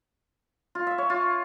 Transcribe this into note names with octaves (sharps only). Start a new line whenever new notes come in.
F4
E5
C#5
F4